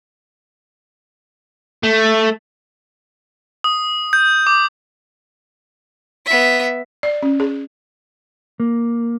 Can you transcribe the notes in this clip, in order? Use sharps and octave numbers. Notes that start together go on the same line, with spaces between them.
A3
D#6
G6
D6
B3 E5
D5
C#4
G#4
A#3